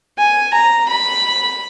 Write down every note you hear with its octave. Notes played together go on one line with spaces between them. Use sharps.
G#5
A#5
B5